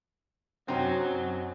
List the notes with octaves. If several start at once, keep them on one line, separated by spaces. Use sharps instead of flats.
F#2 C3 F#3 C4 D#4 A#6